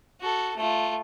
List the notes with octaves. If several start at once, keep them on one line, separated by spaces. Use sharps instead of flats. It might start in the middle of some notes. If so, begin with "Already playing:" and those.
F#4 A4
A3 F4